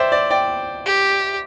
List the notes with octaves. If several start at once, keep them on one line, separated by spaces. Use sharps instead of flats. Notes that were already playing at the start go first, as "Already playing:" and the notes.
Already playing: C5 D5 E5 G5
D5
D5 G5
G4